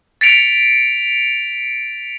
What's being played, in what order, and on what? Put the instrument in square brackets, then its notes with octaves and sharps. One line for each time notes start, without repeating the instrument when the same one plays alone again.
[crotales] A6 B6 C#7 D7 F7